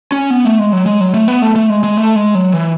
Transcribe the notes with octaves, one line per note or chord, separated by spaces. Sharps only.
C#4
B3
A3
G#3
F#3
G#3
F#3
A3
B3
A3
A3
G#3
G#3
A3
G#3
F#3
E3